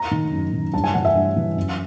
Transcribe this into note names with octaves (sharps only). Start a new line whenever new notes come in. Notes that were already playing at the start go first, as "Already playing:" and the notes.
Already playing: A#5
D#3
F#2
D#3
G2 A5
G#5
E3 F#5
E5
G2
E3
F#2